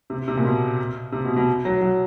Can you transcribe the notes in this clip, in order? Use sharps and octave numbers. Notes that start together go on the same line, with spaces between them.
C3
C3
A#2
B2
C3
B2
B2
F#3
F#3